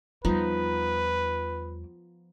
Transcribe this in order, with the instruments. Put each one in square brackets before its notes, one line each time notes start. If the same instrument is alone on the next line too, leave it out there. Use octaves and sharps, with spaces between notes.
[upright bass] E2 G3 [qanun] F3 B3 D#4 [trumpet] B4